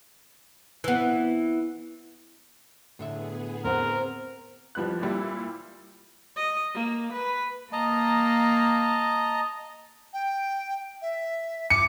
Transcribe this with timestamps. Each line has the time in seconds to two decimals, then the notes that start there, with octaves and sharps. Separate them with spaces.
0.84 E3 B3
2.99 A2 D3 B3 G#4 E5
3.64 C4 A#4 C5 F#5
4.75 F2 F3 G3 B3 F#6
5.01 A#2 G3 E4
6.36 D#5
6.74 A#3
7.12 B4
7.73 A#3 D#5 A5 A#5
10.13 G5
11.02 E5
11.70 D6 C#7